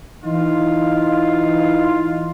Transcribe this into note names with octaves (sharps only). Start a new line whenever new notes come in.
E3 D#4 F4